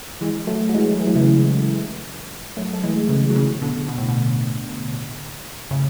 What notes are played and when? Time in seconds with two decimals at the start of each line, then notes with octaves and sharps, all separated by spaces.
0.21 E3 G#3
0.47 F#3 A3
0.69 F#3
0.74 E3 G#3
1.00 E3
1.07 F#3
1.15 C#3 E3
2.57 F#3 A3
2.73 A3
2.83 E3 G#3
3.09 C#3 E3
3.30 F#3
3.36 C#3 E3
3.62 B2 D3
3.88 B2
3.98 A2
4.08 B2
5.71 A2 C#3